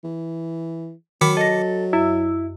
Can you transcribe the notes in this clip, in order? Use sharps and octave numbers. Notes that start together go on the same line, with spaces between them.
E3
D#3 F#3 B5 D6 C#7
A4 D#5 A#6
F#2 E4